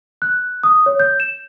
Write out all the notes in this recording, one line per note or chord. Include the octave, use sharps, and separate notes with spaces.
F#6
D#6
C#5
G6
E7